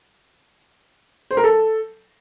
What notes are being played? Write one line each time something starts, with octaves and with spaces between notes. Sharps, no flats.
C5
A#4
A4